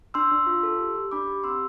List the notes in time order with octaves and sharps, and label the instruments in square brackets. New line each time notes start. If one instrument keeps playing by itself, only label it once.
[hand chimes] D4 C6 E6
D4
F4
A4
G4
G4
D4 B5 D6
G4
C4 C6 E6